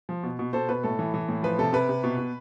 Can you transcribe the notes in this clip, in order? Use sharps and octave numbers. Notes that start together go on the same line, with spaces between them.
F3
B2
B2
B2 A4 C5
B2 B4
A2 A4
E3
E3
A2
F3 B4
C3 A4
C3 B4
C3
B2
B2